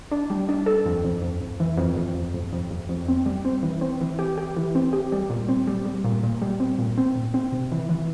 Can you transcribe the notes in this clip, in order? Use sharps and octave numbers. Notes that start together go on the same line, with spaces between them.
D4
G3
D4
A4
F2
F2
F2
F2
E3
F2
F2
F2
F2
F2
F2
F2
C4
G3
C4
E3
C4
E3
G4
G4
E3
C4
G4
G3
A#2
C4
G3
G3
A#2
A#2
G3
C4
A#2
C4
A#2
C4
C3
E3
E3